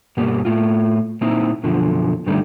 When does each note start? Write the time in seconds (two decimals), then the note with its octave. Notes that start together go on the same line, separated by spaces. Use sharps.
0.17 G2 B2 G3 A#3
0.45 A2 F4
1.21 A#2 A#3 C4 D#4 E4
1.63 F#2 B2 D3 F3
2.26 G2 D3 D#3 G3 A3